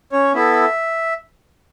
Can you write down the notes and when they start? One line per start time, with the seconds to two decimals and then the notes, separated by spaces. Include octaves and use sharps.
0.12 C#4 C#5
0.34 B3 E4 A4 E5